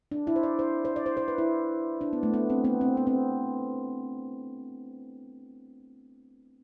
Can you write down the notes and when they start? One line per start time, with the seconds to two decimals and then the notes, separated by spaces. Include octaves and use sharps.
0.12 D4
0.27 E4
0.36 C5
0.43 D5
0.59 C5
0.85 C5
0.96 D5
1.06 C5
1.17 C5
1.28 B4
1.38 E4
2.01 D4
2.13 B3
2.23 A3
2.34 B3
2.50 C4
2.64 B3
2.81 C4
2.97 B3
3.07 C4